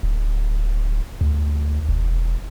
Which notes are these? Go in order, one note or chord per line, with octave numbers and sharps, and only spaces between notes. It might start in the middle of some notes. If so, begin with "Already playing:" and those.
D1
D2
E1